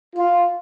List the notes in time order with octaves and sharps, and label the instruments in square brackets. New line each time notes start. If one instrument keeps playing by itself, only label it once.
[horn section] F4